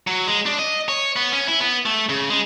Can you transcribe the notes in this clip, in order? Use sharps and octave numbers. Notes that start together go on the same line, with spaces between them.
F#3
G#3
D4
D#5
C#5
B3
C#4
E4
B3
A3
C#3
G#3